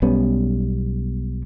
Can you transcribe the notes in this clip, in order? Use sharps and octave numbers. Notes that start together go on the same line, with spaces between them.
B1 G3 B3 C#4